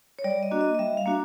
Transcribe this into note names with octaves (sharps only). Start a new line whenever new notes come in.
C#5
G3 D5
D#5
A#3 D4 F#4
D#5
D#5
G3 E5
F5
A#3 D4 F#4